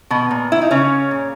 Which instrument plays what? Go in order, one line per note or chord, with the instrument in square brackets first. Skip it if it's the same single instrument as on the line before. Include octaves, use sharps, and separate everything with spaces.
[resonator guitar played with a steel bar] B2 B3
A#2
E4
D#4
C#3 C#4
A#2